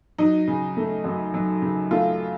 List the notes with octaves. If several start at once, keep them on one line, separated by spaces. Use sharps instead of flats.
F#3 D#4
C#3
A3
F#2
F#3
C#3
A3 F4